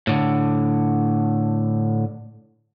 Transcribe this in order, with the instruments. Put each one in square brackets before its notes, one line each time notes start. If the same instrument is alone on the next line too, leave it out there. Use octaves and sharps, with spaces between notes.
[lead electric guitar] A2 D3